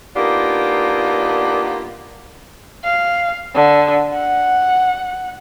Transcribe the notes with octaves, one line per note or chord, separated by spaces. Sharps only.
A#3 B3 D4 D#4 F4 G4
F5
D3
F#5